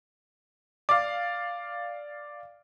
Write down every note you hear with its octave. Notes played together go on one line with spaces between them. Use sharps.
D5 F5 D6